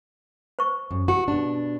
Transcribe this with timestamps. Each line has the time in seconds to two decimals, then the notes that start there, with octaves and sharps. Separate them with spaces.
0.59 C5 C#6
0.91 F#2
1.08 F#4 G4
1.28 B2 D4